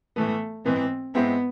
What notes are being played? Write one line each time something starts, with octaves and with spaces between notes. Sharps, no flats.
A2 E3 A3 B3
G#2 E3 B3 C4
G#2 G#3 B3 C4 E4